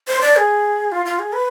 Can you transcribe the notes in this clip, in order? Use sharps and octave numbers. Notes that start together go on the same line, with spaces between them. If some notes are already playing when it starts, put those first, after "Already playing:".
C5
D5
G#4
F4
F4
G#4
B4